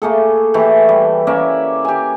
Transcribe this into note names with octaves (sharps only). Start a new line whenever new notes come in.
A3 A#3 G#4 A4
E3 A3 G4
G3
A#3 C#4 D5 E5
G4 G#5